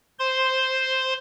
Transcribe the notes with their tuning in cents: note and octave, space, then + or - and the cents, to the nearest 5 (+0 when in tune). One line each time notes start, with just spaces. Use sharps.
C5 +0 C6 +0